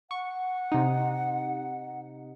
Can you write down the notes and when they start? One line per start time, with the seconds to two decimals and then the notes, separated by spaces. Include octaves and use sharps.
0.11 F#5 C#6
0.72 C3 D#4